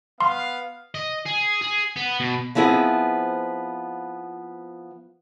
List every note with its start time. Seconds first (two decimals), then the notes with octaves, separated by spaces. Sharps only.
0.21 B3 F5 C6
0.95 D#5
1.26 G#4
1.61 G#4
1.96 B3
2.20 B2
2.55 F3 B3 C4 E4 G#4